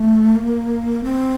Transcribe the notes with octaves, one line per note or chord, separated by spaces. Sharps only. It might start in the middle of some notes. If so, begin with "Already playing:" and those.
Already playing: A3
A#3
C4